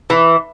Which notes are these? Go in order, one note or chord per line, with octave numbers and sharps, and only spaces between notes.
E3